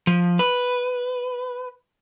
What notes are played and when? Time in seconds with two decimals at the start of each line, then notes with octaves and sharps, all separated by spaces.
0.07 F3
0.39 B4